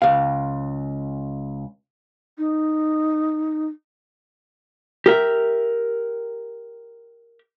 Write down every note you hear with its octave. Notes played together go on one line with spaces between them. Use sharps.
C#2 F5
D#4
G4 A#4 E5